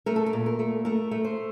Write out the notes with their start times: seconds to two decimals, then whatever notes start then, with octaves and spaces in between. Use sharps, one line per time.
0.06 A3 A#4
0.16 A4
0.26 A#4
0.33 A#2
0.46 A#4
0.59 A3
0.85 A3 A#4
1.11 A3
1.25 C5